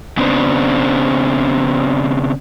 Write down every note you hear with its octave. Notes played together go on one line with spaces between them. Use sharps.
C#3 B3 C4 D4